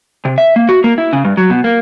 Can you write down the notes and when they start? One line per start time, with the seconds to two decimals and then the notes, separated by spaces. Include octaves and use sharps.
0.25 C3
0.38 E5
0.56 A#3
0.69 F#4
0.84 A#3
0.98 E4
1.13 C#3
1.25 G2
1.37 F#3
1.50 B2
1.64 A#3